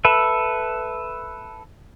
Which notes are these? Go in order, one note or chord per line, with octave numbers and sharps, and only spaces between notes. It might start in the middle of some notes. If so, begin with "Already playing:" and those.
A4 B4 E5